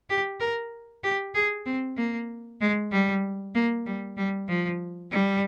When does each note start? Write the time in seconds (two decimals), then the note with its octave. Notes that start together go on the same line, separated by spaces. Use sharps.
0.10 G4
0.40 A#4
1.04 G4
1.35 G#4
1.66 C4
1.97 A#3
2.61 G#3
2.92 G3
3.55 A#3
3.86 G3
4.17 G3
4.48 F3
5.11 G3